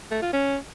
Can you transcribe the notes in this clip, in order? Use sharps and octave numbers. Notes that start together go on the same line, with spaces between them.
A3
F4
C#4